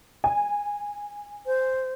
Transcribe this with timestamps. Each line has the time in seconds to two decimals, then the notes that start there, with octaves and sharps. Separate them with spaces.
0.24 G#5
1.46 C5